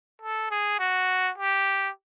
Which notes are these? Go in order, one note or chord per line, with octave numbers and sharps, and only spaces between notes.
A4
G#4
F#4
G4